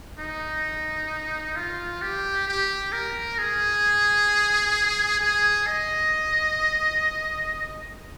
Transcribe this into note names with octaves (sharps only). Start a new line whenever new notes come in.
D#4
F4
G4
G4
A#4
G#4
G#4
D#5